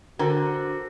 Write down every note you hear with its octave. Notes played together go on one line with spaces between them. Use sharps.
D3 F#4 A#4 C5 A5